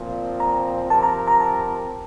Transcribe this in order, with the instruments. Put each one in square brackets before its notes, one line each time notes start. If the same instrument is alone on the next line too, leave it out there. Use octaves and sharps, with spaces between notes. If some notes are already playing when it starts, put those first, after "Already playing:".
Already playing: [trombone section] A#2 F3 C4
[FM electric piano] A#5
[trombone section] F3 C4 G4 A#4 [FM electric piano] A5
[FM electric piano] A#5
A#5
A5